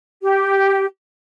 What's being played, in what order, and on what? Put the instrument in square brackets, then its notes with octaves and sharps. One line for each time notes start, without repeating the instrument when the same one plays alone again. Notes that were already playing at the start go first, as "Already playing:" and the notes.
[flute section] G4